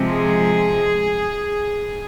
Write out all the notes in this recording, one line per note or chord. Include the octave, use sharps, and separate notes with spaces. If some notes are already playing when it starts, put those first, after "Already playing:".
Already playing: C3 F3 G#3 C4
G#4